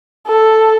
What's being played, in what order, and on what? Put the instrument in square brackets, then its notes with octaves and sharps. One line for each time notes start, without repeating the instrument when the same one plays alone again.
[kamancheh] A4